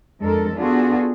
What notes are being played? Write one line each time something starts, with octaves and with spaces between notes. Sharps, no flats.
F2 G#3 D4 A4 A#4
B3 D4 F4 F#4 G#4 A4